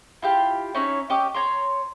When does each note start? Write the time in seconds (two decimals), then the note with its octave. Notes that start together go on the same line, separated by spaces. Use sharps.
0.22 E4 F4 G4
0.75 C#4 D#4 E4 C#5
1.10 C#4 G4 D#5 D6
1.35 C#5 A#5 C6